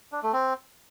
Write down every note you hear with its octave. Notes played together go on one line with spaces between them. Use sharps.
D4
A3
C4